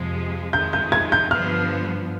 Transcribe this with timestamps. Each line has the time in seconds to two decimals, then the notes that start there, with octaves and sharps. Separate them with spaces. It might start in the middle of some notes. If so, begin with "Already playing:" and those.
Already playing: F2 C3 F3 G#3
0.53 F2 D#3 G#3 G6
0.73 G6
0.92 G#6
1.12 G6
1.30 G2 D3 F3 B3 F6